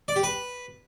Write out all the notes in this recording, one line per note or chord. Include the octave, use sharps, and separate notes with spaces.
D5
G4
B4